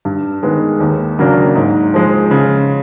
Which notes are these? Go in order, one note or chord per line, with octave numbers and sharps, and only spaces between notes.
G2
D#3 G#3 B3
D#2
C#3 F#3 A#3 D4
G#2
F3 G#3
C#3